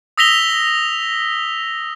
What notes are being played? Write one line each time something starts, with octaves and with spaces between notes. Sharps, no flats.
D#6 E6 A#6 B6 F7 G7